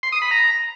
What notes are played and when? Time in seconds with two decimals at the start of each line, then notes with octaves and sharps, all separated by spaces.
0.03 C6
0.12 D#6
0.22 B5
0.31 A#5